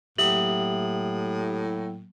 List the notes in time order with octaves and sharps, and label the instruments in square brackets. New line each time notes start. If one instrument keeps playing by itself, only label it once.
[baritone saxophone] A2 [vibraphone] F#3 A#3 G5 [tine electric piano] G4 E5 D#6 [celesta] F#7